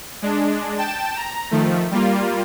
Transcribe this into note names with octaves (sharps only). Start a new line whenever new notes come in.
G#3 D4
G5 A5 E7
A#5
D#3 F3 A3
G3 A#3 F4